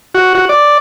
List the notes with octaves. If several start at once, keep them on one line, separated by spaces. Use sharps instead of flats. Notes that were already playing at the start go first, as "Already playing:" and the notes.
F#4
F#4
D5